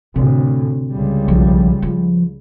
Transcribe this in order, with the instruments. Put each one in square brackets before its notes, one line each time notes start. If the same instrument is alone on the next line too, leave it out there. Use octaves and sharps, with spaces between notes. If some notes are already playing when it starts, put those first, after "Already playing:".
[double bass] D2 A2 [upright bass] C3
[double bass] C#2 G3
[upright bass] B1 F3
F3